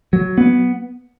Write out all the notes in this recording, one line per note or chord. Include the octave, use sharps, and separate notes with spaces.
F#3
B3